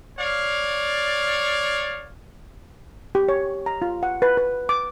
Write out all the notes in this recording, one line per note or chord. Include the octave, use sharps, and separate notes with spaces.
C#5 D5 F5
G4
C#5
A#5
F4
F#5
B4
B4
D6